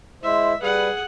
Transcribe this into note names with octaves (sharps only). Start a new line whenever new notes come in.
G#3 E4 C5 E5
G3 G#4 B4 F#5